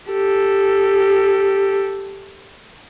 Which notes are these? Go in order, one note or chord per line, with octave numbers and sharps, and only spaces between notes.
G4 A4